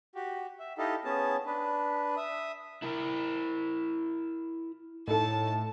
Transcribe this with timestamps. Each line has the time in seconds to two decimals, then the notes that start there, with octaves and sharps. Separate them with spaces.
0.15 F#4 G4
0.60 E5
0.78 D#4 E4 G4 A4 D#5 F5
1.05 B3 C#4 G#4 A5
1.46 D4 B4
2.17 E5 D#6
2.82 E4 A#4
5.08 A2 D#4 A4 A5